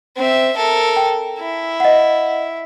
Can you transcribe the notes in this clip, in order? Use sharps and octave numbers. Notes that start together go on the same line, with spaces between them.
C4 E5
A4 A#4
G5
E4
D#5 F#5